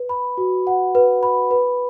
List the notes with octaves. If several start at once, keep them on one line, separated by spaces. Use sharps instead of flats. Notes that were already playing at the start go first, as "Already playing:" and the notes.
Already playing: B4
B5
F#4
F#5
B4
B5
B4